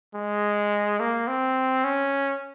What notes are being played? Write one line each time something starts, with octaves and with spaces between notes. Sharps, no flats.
G#3
A#3
C4
C#4